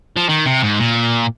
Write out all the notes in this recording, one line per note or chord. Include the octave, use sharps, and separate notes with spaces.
F3
D#3
C3
G#2
A#2